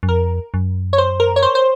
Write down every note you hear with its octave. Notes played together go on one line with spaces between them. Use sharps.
F#2
F2 A#4
F#2
C#5
C5
A#4
C#5
C5
C5